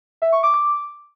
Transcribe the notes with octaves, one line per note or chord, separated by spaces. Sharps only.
E5
C#6
D6
D6